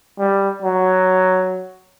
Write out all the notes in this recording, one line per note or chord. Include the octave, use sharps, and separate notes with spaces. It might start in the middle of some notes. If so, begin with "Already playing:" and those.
G3
F#3